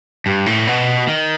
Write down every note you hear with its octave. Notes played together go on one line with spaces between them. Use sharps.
G2
A2
B2
D#3